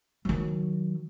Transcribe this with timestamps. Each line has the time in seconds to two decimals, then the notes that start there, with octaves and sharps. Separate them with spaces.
0.25 D#3 F#3